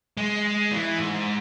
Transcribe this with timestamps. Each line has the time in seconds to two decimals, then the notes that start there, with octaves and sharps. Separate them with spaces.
0.17 G#3
0.71 E3
0.99 G#2